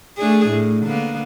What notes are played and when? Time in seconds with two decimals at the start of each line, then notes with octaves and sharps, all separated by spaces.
0.17 A3 D4 G#4
0.48 A2
0.85 D3 A#3 B3